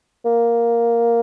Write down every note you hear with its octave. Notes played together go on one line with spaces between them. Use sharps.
A#3